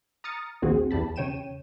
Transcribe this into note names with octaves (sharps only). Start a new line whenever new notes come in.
A#5 D#6 F6 A6 C#7
A#1 D#2 C4 F#4 G#4
E2 G4 A5 B5
C#3 C#5 G5 D#7 E7